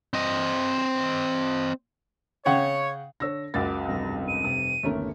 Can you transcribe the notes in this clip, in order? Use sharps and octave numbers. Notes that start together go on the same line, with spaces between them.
C4 D#5
C#3 C#5 F#5 G5
D3 C#5 E6 A#6
F#1 C#2 F#4 D6 A6
F1 G2 A#6
D#7
C3
G1 D#2 A3 C#4 A#4